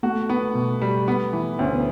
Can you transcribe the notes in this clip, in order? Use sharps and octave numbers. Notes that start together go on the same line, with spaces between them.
A3 F#4
B3
B2
G3
B3
E3
D2 C#4
B3